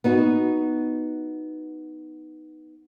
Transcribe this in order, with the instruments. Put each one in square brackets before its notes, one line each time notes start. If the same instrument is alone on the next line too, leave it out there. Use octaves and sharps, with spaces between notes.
[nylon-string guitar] B3 D#4 F#4